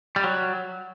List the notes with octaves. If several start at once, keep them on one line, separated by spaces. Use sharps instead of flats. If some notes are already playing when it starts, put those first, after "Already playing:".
G3
F#3